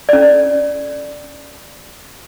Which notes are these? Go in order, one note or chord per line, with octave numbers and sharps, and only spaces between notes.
C#4 D5